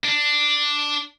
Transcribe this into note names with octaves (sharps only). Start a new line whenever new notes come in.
D4